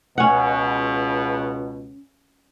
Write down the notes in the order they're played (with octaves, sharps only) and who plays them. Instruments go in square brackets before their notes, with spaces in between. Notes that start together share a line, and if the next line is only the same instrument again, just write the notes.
[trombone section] C#2 B2 [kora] C#4 F#5